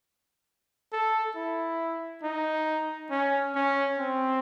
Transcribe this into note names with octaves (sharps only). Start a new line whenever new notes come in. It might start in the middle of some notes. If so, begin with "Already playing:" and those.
A4
E4
D#4
C#4
C#4
C4